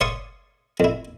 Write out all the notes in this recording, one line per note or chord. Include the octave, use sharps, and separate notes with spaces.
C#5 D5 F5 C6 C#6 D#6
F2 E4